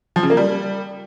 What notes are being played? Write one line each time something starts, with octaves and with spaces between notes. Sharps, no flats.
F3
C#3
A#3
G3